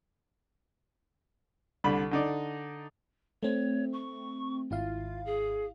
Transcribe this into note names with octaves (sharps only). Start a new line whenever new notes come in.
C2 D3 B5
D3 D#4 D5
A3 C4 C#5
C#6
G#1 E4 F4 F5
G#4